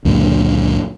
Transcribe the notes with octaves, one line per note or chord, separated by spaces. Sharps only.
C#2 F#2 A#2 D3